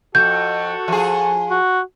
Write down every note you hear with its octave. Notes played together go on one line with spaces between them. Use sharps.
F2 F#4 A4 G6
F3 G#4
F#4